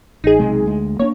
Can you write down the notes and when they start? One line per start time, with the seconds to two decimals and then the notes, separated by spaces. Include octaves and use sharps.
0.24 A1 D#4 G#4
0.39 B1 C3 G#3
0.66 D2 G#3
0.99 A#3 C#4 D4 C#5